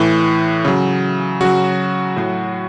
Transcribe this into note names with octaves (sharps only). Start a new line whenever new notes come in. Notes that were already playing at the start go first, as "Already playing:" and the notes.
Already playing: A2 E3
C#3 F#3
C#3 F#3 F#4
A2 F#3